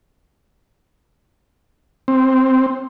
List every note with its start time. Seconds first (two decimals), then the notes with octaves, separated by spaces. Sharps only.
2.08 C4